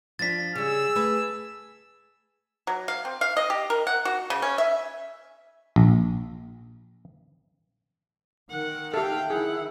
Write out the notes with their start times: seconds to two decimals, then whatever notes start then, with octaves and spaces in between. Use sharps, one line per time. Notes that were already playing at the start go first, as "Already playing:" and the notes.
0.19 F3 D4 F4 A6 B6
0.55 C#3 G3 G#4 E6
0.95 A3 B4
2.67 F#3
2.88 F5
3.05 C4
3.21 F5
3.37 D#5
3.50 G4
3.70 A#4
3.87 F#5
4.05 F#4
4.30 C#3
4.42 C#4
4.58 E5
5.76 A#1
8.51 D#3 A#4 F#5
8.94 G4 A4 E5 F5 G5
9.30 D#3 E4 G#4 F#5